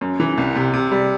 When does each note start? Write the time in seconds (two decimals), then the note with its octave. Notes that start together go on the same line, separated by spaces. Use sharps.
0.01 F#2
0.20 E3
0.38 C2
0.55 C3
0.73 C3
0.91 G3